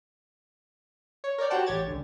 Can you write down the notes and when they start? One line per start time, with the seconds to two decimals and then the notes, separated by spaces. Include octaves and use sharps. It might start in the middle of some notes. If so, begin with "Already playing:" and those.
1.24 C#5
1.38 A#4 C#5 D5 G5
1.50 F#4 G4 C5 F#5 G5 A5
1.66 A1 G4 C#5 G#6 A6
1.87 C#2 D3